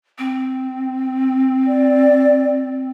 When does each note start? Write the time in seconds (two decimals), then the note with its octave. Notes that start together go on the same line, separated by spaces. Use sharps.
0.18 C4
1.67 D5